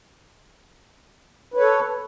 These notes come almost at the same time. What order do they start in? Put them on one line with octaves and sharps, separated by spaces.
B4 C#5 A4